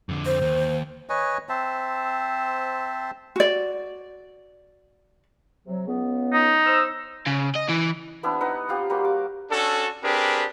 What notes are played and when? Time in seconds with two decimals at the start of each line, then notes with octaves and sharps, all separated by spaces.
0.09 F2 D3
0.26 C5
0.42 D#2
1.09 B4 C#5 D#5 G#5
1.49 C4 C5 E5 A5
3.36 F#4 D5
5.66 C3 F#3
5.87 C#2 C#3 B3
6.33 D#4
6.66 C5 E6
7.27 C#3
7.56 D#5
7.69 E3
8.23 B3 C4 D4 E4
8.41 D#4 B4 F#5
8.69 C4 F4 G4
8.90 G3 A#3 F#4 C5
9.05 D6
9.51 C#4 D4 F#4 A4
10.03 C4 D4 G4 G#4 A#4 B4